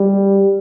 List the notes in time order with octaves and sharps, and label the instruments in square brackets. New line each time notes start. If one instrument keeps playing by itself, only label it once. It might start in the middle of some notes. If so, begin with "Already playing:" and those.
Already playing: [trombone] G3